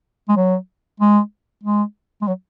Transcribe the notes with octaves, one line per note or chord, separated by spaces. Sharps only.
G#3
F#3
G#3
G#3
G#3
F#3